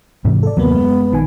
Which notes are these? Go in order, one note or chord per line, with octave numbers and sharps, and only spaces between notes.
G#2 C3 E3
A4 D5
D#2 C3 F#3 A#3 B3
F#2 G#3
A#1 D#3 G#5